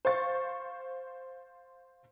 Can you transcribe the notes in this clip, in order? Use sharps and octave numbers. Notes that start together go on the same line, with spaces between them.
C5 F5 C#6 A6